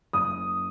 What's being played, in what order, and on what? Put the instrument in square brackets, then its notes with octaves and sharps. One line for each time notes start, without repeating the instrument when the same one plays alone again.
[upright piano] F#1 D#6